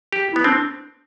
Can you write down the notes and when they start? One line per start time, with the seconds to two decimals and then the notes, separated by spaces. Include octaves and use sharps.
0.13 G4
0.33 E4
0.36 B3
0.44 C4 D4